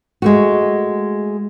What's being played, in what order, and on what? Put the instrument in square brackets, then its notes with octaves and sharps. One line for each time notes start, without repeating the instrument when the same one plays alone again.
[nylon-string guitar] G#3 A3 F#4